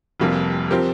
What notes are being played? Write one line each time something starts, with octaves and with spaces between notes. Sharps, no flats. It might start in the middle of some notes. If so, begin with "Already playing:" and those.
F1 F2 C3 G3 A#3
F3 C4 G4 A#4